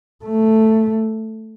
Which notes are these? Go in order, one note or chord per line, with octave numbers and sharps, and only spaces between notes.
A3